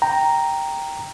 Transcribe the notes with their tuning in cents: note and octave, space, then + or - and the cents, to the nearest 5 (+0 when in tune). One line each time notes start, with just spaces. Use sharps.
G5 +0 A#5 +0